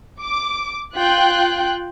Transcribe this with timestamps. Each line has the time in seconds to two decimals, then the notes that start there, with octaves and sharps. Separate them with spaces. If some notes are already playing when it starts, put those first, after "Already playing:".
0.20 D6
0.94 F4 G5 F#6